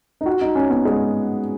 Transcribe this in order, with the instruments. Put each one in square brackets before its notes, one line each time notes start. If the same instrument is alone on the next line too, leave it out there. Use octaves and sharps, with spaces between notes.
[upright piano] D#4
F#4
D#4
C#4
B3
G#3